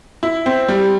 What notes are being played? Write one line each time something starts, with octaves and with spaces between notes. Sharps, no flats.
E4
C4
G3